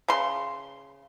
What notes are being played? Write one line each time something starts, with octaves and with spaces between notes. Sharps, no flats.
C#3 C6